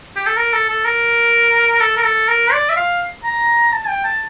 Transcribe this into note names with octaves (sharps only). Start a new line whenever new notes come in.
G4
A4
A#4
A4
A4
A#4
A4
A#4
A4
A#4
D5
E5
F5
A#5
A5
G5
A5